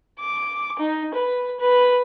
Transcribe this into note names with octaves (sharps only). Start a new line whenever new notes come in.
D6
D#4
B4
B4